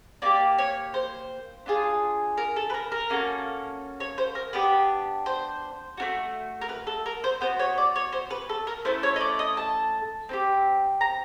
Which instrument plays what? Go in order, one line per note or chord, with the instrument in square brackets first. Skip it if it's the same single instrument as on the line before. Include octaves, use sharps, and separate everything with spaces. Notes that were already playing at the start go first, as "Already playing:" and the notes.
[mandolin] A#3 D#4 G4 D5
C#5
C5
D4 F4 G#4
A#4
A4
B4
A#4
A#4
A#3 C#4 F#4 A4
C#5
C5
A#4
B3 D4 G4 B4
C5
A3 D4 F#4
A#4
B4
A4
A#4
C5
B3 D4 C5
F#4
C#5
D5
C#5
C5
B4
A4
A#4
A3 C#4 E4 A4 C5
C#5
D#5
D5
D#5
A5
C4 D#4 G4
A#5